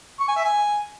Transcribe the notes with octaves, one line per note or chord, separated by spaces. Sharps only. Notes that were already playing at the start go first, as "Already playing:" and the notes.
C#6
G#5
E5
G#5